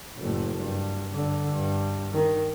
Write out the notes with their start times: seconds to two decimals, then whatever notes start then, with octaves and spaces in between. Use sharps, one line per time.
0.17 F#1 A2
0.57 G2
1.13 G2 D3
1.50 G2
2.12 D#3